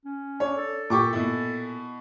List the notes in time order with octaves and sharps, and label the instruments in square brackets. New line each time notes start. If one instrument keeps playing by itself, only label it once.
[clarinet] C#4
[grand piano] D4 [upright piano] C#5
[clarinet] A4
[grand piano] A#2 [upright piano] G4 C#6 D6
[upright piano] B2 E4